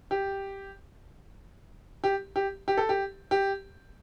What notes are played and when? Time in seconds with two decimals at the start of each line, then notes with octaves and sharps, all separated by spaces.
0.11 G4
2.04 G4
2.36 G4
2.68 G4
2.77 A4
2.89 G4
3.31 G4